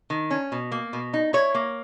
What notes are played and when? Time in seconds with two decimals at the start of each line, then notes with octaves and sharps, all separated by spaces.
0.10 D#3
0.31 C#4
0.52 B2
0.72 A#3
0.93 B2
1.14 D#4
1.33 E4 C#5
1.55 A#3